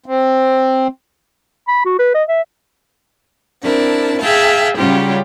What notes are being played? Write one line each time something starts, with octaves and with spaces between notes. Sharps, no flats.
C4
B5
F#4
B4
D#5
E5
C4 D4 E4 A#4 A5
G#4 E5 F5 G5 A5
C#3 F#3 G3 C#4 F4 G4